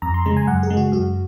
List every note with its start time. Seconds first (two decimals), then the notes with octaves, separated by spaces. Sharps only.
0.02 F2 A#5
0.14 C6
0.25 C#3 G#3 A#5
0.37 G#5
0.47 F#2 F#5
0.63 G#4
0.70 C#3 G#3
0.77 F#4
0.92 F#2 F#4